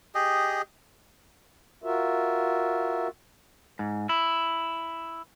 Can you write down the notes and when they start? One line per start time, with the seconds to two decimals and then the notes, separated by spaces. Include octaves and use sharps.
0.15 G4 G#4 D#5
1.84 F4 F#4 A#4 E5
3.79 G#2
4.09 E4